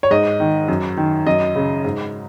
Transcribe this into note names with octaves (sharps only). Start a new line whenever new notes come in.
C#5
G#2 D#5
D#3
F#2
D#3
F#2 D#5
C#3
G#2